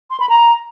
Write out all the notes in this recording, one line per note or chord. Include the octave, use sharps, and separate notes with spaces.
C6
B5
A#5